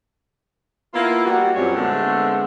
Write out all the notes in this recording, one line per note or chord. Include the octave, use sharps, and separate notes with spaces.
A#3 B3 E4 F4
G3 F#4
F#2 A#2 G3 C4 C#5
D3 G#3 A3 B3 C4